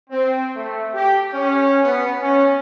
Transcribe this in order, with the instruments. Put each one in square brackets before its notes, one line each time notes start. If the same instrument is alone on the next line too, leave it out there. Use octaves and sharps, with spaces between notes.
[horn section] C4
A3
G4
C#4
B3
C#4